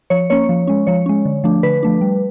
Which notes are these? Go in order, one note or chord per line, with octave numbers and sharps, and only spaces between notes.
F3 C#5
A#3 C#4 C#5
F3
G#3 C#4
F3 C#5
G#3 C#4
D3
F3 A3 D4
D3 B4
F3 A3 D4
G3